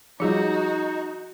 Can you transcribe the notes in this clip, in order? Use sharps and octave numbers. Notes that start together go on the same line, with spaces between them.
F3 G3 D#4 F4 F#4 G#4 C#7